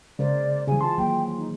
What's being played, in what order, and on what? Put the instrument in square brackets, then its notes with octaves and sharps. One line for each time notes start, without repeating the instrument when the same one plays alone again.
[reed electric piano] C#3 [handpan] G#3 A#4 C5 [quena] D5
[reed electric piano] C#3 G3 [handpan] E3 G#4 [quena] G#5
[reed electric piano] F4 C6 [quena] A5
[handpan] D#3 F#3 A#3 [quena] G5
[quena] D#4